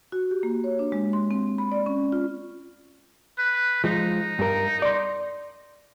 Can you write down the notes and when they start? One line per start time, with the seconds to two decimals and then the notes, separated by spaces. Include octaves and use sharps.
0.12 F#4
0.31 G4
0.43 A#3
0.64 C#5
0.79 D4
0.92 G#3
1.13 C6
1.31 C4
1.58 B5
1.72 D5
1.86 C#4
2.12 F4
3.38 B4
3.84 F3 G#3 D#4
4.39 G2 A#4
4.82 D5 C6